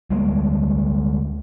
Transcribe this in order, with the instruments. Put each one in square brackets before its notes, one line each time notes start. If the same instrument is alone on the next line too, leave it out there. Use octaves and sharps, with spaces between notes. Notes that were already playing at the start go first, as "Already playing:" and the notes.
[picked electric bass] D2 G3 G#3 A#3